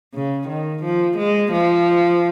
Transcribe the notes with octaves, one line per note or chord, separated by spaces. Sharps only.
C#3
D#3
F3
G#3
F3